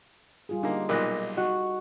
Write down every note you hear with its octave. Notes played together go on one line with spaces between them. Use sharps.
G3 F4 G#4
D3 A#3 D#4
B1 A#2 A#4 D#5 F#6 A#6
F#4 D#5 F#5